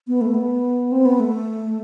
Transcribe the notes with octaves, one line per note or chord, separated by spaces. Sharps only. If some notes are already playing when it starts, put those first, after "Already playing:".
B3
A3
B3
C4
B3
A3